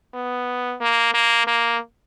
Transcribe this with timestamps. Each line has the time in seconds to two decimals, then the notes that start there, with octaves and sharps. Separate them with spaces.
0.14 B3
0.81 A#3
1.14 A#3
1.47 A#3